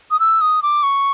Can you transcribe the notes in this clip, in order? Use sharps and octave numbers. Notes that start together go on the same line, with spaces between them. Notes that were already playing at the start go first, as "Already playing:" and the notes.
D#6
E6
D#6
D6
C#6